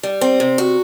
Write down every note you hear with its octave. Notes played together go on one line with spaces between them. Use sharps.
G3
C4
C3
F#4